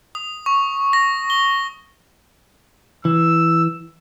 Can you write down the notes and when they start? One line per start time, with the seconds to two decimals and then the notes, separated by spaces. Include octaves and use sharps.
0.15 D#6
0.46 C#6
0.93 A#6
1.30 G7
3.05 E3 E6